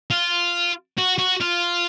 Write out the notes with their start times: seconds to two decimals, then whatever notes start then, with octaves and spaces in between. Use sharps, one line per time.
0.11 F4
0.98 F#4
1.18 F#4
1.40 F4